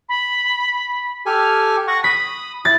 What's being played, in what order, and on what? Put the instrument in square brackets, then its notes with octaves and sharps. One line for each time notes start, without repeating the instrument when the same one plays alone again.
[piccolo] B5
[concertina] G4 A4 G#5 [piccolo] F6
[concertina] F#5 C#6 [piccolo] A#6
[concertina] B5 [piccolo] D#6 [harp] B6
[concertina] E4 [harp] A6